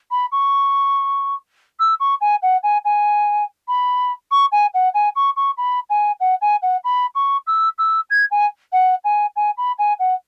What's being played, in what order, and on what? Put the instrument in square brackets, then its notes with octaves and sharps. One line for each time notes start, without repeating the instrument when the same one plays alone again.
[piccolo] B5
C#6
E6
C#6
G#5
F#5
G#5
G#5
B5
C#6
G#5
F#5
G#5
C#6
C#6
B5
G#5
F#5
G#5
F#5
B5
C#6
E6
E6
G#6
G#5
F#5
G#5
G#5
B5
G#5
F#5